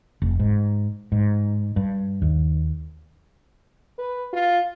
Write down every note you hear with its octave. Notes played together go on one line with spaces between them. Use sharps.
F1
G#2
G#2
G2
D#2
B4
F4